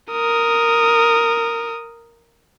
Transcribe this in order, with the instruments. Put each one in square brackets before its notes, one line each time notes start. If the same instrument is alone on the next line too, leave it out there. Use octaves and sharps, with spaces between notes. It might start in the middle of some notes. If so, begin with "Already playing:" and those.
[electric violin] A#4 D#6